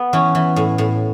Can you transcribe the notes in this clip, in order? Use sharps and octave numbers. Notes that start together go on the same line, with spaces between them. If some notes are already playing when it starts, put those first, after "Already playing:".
Already playing: B3
E3 C#4
E3
A2
A2